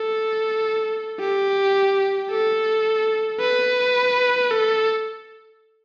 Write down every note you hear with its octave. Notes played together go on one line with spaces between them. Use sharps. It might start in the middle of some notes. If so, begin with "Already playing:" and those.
Already playing: A4
G4
A4
B4
A4